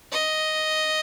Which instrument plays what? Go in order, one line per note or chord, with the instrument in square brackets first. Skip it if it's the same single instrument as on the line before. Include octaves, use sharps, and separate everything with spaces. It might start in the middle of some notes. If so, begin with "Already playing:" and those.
[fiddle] D#5